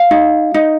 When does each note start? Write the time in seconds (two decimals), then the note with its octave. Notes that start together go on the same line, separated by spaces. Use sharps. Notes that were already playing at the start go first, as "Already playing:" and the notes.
Already playing: F5
0.11 D#4
0.54 D#4